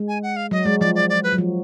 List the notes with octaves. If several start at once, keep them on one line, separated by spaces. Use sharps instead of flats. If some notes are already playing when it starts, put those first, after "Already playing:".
Already playing: G#3
G#5
F#5
F5
F#3 D#5
G#3 D5
F3 D5
D5
D5
B4
F#3
F3